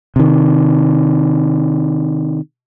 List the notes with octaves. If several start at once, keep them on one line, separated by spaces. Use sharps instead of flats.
C3 D#3